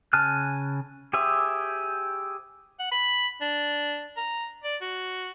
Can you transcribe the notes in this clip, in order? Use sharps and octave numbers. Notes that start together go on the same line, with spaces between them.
C#3 G#5 A5 F6 F#6
G4 G#4 C5 E5
F#5
B5
D4
A#5
D5
F#4